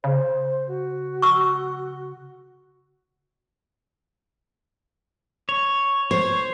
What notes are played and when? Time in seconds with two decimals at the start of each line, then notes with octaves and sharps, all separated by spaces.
0.04 C#3 C5
0.68 F#4
1.22 C#6 E6
5.49 C#5
6.11 C5 C#5